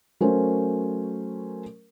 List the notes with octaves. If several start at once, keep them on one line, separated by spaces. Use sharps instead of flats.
F#3 A3 C#4 A#4 C5